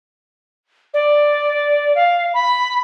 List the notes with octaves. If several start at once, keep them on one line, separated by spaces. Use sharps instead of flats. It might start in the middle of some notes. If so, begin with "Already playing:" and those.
D5
F5
B5